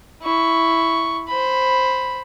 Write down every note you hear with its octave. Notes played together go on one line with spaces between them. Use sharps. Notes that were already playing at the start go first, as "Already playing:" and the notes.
E4 C#6
C5 B5